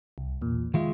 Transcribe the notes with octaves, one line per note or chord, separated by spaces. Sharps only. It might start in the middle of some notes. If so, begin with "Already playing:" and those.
C2
E2 A#2
D#3 G#3 F4 E5